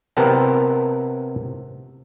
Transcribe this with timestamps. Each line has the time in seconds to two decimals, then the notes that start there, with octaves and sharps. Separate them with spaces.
0.17 C3 B3 A#4 G5 A5 A#5